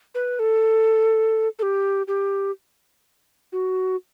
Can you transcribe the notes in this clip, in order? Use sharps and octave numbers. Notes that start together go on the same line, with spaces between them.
B4
A4
A4
G4
G4
F#4